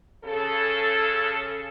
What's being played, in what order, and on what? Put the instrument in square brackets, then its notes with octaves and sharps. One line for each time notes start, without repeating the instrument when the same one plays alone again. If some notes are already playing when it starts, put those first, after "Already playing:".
[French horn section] C#3 A4